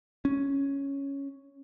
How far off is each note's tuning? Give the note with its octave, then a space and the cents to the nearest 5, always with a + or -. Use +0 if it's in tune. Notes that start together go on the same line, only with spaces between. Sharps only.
C#4 +0